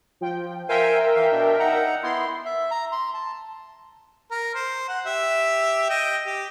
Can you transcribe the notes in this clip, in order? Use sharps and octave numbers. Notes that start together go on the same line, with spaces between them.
F3 G5
A#4 C5 E5 F5 G5 G#5
E3 F5
B2 D4
D#4 F#5 A#5
B3 E4 C6
E5
A#5
C6
A5
A#4
C5
F#5
G4 E5
D#5 G5
G4